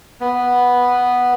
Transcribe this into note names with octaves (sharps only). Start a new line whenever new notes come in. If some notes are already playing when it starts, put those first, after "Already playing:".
B3